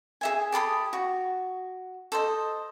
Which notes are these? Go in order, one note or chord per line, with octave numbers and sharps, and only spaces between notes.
G#4 E5 G#5
G4 A4 B5 D#6
F#4
A4 C5 D#5